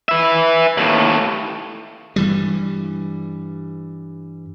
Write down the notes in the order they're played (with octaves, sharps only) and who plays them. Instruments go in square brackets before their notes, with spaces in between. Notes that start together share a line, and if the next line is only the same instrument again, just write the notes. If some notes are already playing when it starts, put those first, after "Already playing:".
[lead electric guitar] B4 E5
D#2 A2
[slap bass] G2 E3 G3